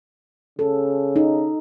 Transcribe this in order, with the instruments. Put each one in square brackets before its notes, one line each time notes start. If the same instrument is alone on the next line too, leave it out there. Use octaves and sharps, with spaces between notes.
[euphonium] C#3 [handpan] A4
[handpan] D#4